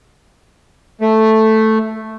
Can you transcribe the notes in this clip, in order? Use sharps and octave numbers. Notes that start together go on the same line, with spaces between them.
A3